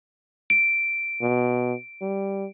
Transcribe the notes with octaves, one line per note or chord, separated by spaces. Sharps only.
D7
B2
G3